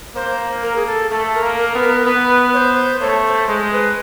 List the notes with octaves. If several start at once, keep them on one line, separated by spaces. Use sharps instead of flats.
A#3 C5
A#4
G#4
A4
A3 A4
A#4
A#3
A#4
B3
A#4
B3 B4
C#5
C5
A3 C#5
C5
G#3 C5
B4